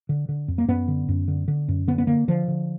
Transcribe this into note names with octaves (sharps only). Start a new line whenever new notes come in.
D3
D3
F2
A#3
F#2 B3
D3
F#2
D3
D3
F#2
D3 B3
B3
D3 A#3
D3 F3
D3